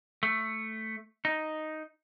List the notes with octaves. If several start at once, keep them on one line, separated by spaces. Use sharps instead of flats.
A3
D#4